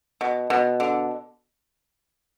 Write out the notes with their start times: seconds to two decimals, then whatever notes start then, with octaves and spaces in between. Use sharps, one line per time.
0.21 B2
0.50 B2
0.80 D3